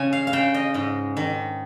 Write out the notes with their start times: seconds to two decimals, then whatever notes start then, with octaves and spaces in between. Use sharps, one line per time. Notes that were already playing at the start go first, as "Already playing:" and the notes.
Already playing: C#3 C#4 G#5
0.13 F5
0.27 F5
0.33 C#3 G5
0.54 D#5
0.74 G#2 D#5
1.17 D#3